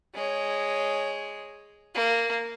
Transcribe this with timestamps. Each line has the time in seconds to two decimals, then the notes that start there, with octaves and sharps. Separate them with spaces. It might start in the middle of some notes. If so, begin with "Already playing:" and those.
0.15 G#3 C#5
1.95 A#3